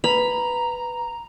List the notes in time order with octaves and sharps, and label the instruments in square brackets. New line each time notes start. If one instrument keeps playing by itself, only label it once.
[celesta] B4 [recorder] A#5 [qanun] B5 [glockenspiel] F7